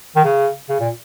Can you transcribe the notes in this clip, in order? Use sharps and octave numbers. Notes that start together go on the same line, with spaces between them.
D#3
C#3
C#3
A#2